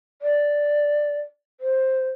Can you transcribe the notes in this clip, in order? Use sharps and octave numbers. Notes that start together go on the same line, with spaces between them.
D5
C5